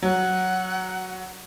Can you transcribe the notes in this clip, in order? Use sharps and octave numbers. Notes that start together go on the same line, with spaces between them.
F#3 F#5